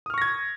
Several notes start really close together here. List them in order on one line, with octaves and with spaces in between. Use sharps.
D#6 F6 C#6 A#6 G#6